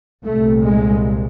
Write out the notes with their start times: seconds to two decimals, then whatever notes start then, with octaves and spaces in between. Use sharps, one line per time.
0.25 C2 A#2 A3
0.63 G#3